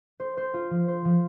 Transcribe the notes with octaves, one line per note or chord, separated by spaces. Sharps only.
C5
C5
F4
F3
C5
F3